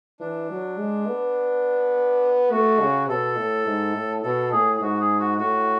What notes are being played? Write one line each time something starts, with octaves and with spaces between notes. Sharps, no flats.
E3 D4
F#3
G#3
B3
A3 F#4
C#3
B2 A4
A2
G#2
A2
B2 A4
A2 G#4
G#4
G#2 F#4
G#4
F#4
A2 F#4